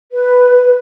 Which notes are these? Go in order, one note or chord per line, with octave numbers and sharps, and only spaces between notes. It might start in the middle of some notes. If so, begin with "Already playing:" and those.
B4